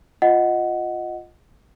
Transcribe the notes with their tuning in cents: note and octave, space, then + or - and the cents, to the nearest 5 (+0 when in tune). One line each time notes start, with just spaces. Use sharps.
F4 +5 D#5 +0 F#5 +0